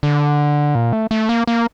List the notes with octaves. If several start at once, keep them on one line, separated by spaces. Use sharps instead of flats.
D3
A#2
A3
A3
A#3
A#3